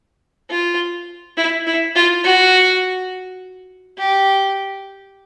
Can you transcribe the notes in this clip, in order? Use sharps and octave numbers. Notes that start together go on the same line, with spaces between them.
F4
E4
E4
F4
F#4
G4